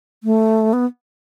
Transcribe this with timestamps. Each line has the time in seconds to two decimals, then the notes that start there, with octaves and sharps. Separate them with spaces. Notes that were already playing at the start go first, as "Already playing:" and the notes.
0.24 A3
0.73 B3